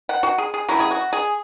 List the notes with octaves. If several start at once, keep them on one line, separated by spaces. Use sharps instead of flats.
F#5
F#4
G#4
G#4
F#3 C#4 E4 F#4
G#4
F#4
G#4